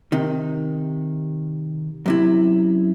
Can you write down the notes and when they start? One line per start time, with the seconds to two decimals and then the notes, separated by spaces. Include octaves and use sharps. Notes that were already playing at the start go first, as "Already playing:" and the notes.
0.12 C3 D#3
2.06 F#2 C3 E4